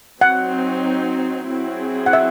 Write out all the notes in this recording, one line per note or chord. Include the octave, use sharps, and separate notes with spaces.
F#3 C4 D#4 F#5
F#3 C4 E4 G#4
F#5
E5